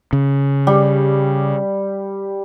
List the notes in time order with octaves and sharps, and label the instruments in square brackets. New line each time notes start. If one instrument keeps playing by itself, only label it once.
[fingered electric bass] C#3
[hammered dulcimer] G3